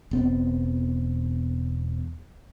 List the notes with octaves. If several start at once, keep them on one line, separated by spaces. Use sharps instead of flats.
E1 B3 C4